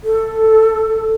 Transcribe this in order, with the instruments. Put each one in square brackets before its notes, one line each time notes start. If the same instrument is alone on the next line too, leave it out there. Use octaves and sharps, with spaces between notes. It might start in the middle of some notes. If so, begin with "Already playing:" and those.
[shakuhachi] A4